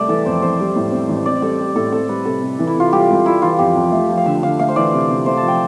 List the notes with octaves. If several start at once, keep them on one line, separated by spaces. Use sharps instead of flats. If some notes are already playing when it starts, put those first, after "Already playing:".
Already playing: C2 A3 D5 E5 G5
E3 A4
F2 C5
F2 C5
G3
A2
C4
A1
C4 D5
G3 A4
G4
A2 A4
C4 A4
G3 B4
C3 A4
C3
E3
E4
C3 F4
G3 G4
C2
G3 E4
E3 F4
F2 G4
F2
A3
F3
F5
D3 E5
D3 F5
A3 F5
C5
E3 D5
C3
C3
A3 C5
A5
F3 G5